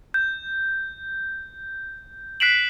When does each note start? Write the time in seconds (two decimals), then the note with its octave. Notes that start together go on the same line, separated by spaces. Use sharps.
0.14 G6
2.40 F#6 B6 C7 D7 E7 F#7